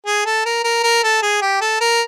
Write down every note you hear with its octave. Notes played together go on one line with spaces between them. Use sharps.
G#4
A4
A#4
A#4
A#4
A4
G#4
G4
A4
A#4